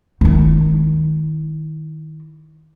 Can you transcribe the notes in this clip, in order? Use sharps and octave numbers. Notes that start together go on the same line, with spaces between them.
D#3 E4